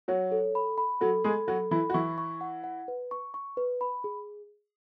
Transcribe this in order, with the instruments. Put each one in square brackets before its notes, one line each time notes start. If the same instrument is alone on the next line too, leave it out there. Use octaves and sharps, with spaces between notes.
[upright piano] F#3 F#4 [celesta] C#5
[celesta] A4
B5
B5
[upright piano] F#3 F#4 [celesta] A4
[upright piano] G#3 G#4 [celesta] B5
[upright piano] F#3 F#4 [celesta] A4
[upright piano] E3 E4 [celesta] B5
[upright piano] F#4
[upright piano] E3 E4 [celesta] C#6
[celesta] C#6
F#5
F#5
B4
C#6
C#6
B4
B5
G#4